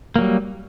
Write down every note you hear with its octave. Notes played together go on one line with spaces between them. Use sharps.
F#3 G3 A#3